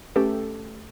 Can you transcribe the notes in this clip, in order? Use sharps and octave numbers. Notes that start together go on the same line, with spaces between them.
A3 C#4 G4 A4 B4